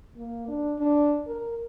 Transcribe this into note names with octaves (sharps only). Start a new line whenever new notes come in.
A#3
D4
D4
A#4